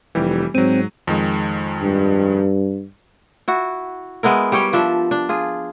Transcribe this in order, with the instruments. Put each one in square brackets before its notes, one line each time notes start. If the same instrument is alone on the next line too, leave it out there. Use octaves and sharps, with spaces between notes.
[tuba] F1 [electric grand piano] E3 G3 G4
[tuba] G#2 [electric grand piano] F#3 D#7 [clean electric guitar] C4
[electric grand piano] F2 D#3 G#3
[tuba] G2
[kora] E4 F#4
G#3 B3 E4 A#4
G3 G4 C#5 G5
F3 D4 E5
D4
F4 G#4